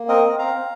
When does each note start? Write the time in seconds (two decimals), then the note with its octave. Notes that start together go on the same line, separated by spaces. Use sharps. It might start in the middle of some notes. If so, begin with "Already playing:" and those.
Already playing: A#3
0.08 C4 A#4 D#5
0.24 C4
0.38 C4 F5 A#5
0.55 C4